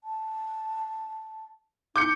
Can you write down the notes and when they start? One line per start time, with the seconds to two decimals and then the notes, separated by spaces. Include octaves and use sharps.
0.04 A5
1.96 D#4 D6 G6 C#7